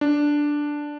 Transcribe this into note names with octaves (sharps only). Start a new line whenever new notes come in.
D4